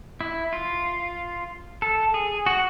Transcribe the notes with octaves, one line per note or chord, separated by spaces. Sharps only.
E4
F4
A4
G#4
F#4